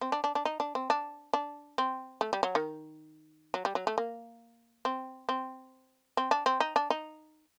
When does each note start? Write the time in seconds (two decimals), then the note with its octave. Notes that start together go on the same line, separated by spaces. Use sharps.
0.01 C4
0.12 D4
0.24 D4
0.35 D4
0.45 D#4
0.60 D4
0.75 C4
0.90 D4
1.33 D4
1.78 C4
2.21 A3
2.33 G3
2.43 F#3
2.55 D#3
3.54 F#3
3.65 G3
3.75 F#3
3.87 A3
3.98 A#3
4.85 C4
5.29 C4
6.17 C4
6.31 D4
6.46 C4
6.60 D#4
6.76 D4
6.90 D#4